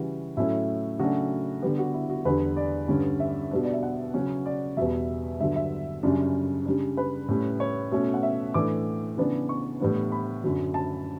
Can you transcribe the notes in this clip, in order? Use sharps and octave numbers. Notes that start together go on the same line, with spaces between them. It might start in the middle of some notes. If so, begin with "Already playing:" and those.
Already playing: C#3 E3 G3 F#4
A2 F#3 A3 C#4 E4
C#3 F#3 A3 D4 F#4
D3 G3 B3 G4
F#4
E4
F#4
E2 D3 G3 D4 B4
D5
G2 D3 G3 C#4
E5
B2 G3 B3 D4
D5
E5
F#5
C#3 F#3 C#4
D5
E2 B2 G3 E5
G2 D3 F#3 E5
E5
F#2 C#3 G3 D4
C#3 G3 D4
B4
A2 G3 C#4
C#5
B2 A3 C#4
F#5
E5
A2 E3 A3 D4 D6
C#3 E3 B3 D4
C#6
A2 E3 G3 B3 D4
B5
F#2 D3 F#3
A5